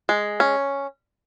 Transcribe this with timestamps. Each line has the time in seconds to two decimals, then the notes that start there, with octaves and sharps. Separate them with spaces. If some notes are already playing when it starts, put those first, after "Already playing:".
0.09 G#3
0.40 C#4